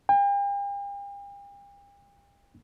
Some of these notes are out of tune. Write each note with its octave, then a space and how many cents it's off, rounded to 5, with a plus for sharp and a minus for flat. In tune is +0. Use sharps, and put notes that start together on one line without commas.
G5 +40